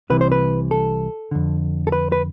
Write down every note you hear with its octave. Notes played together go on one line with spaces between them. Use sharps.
C2 C3 E3 B4
C5
B4
A4
F2 D3
A4
B4
B4